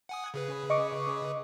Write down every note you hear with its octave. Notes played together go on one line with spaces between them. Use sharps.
F#5 G#5 D#6
C#3 G#4 B4
D#5 C#6 D6